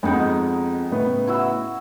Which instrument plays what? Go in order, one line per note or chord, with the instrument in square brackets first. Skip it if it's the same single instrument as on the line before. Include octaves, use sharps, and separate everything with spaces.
[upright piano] F2 G#3 [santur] B3 D#4
[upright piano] A2 C#3 B3 [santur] D#5
[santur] E4 F#4 E6